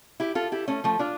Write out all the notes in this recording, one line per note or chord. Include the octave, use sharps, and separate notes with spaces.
E4 G4
F4 A4
E4 G4
A3 C#4
F3 A3
D4 F4